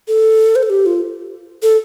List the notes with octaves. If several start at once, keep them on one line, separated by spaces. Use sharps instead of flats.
A4
C5
A4
G4
F4
A4